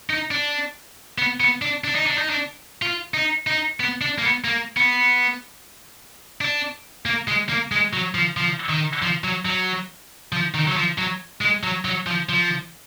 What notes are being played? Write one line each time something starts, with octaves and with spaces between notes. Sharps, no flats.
D#4
D4
B3
B3
D4
D4
D#4
D4
D#4
D4
F4
D#4
D#4
B3
D4
A#3
B3
A#3
B3
D4
A#3
G#3
A#3
G#3
F#3
F3
F3
D#3
F3
F#3
F#3
F3
D#3
F#3
F3
F#3
G#3
F#3
F#3
F3
F3